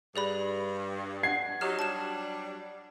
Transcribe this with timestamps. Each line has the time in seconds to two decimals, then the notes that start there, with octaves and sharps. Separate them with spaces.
0.16 G2 G#4 D5 B5
1.23 F#5 G#6 C7
1.61 F#3 D#4 G4 F6
1.79 F#3 G3 D4 A5 E7